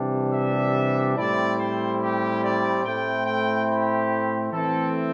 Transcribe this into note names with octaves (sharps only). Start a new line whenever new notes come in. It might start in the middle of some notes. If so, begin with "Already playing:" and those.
Already playing: C3 E3 G3 D4
E5
A2 G3 C4 E4 D5
C5
G4
D5
A2 A3 C4 E4 G5
G5
G4
E3 A3 C4 A4